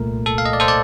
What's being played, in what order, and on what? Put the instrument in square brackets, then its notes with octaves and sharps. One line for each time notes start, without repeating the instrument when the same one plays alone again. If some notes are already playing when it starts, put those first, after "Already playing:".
Already playing: [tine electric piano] C2 A#2 A3 A#4
A4
F5
D#5
D5
A4 C5
D5